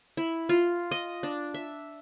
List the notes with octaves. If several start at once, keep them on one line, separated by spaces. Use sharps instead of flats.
E4
F4
D#5
D4
E5